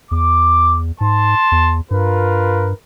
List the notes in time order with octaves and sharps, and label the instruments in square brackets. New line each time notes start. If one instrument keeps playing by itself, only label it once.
[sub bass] E2 [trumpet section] D6
[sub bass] G#2 [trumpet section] A5 C6
[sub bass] E2
[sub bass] G2 [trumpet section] F4 A#4 B4